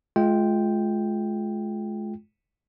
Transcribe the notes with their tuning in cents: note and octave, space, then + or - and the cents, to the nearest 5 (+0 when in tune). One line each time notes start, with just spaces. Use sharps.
G#3 +35 F4 +0 G5 +0